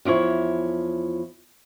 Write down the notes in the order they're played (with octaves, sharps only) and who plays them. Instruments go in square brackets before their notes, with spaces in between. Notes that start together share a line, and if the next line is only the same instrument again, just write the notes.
[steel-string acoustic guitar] E2 F3 E4 C#5